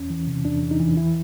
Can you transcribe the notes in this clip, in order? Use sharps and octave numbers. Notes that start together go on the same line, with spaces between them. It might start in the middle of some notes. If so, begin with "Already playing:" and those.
Already playing: E2 C#4
E3
C3
E2 D4
E2
D#4
E3
E3 E4